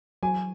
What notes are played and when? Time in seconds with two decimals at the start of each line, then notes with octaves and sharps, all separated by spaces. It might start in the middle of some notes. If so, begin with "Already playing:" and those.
0.23 F#3 G#5